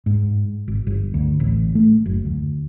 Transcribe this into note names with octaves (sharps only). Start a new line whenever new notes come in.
G#2
G#1
G1
D2
A1
A3
F#1
D2